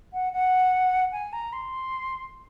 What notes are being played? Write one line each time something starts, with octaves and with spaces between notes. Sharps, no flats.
F#5
F#5
G#5
A#5
C6